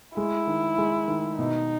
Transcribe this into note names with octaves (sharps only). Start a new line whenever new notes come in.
G#3 E4
D#3
G#3
D#3
B2 D#4